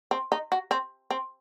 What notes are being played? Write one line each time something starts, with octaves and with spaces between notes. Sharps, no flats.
C4
D#4
F#4
C4
C4